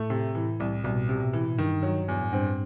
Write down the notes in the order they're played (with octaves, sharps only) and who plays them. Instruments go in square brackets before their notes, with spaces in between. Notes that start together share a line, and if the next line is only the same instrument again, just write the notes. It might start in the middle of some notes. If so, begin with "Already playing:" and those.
Already playing: [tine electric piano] A2 [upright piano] A3
[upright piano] C3
E3
C2
[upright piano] C2 [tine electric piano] B2
[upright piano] C3
E3
[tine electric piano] G2 [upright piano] D#3
[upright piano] F#3
E2
[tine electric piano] A2
[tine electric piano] G2 [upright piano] C4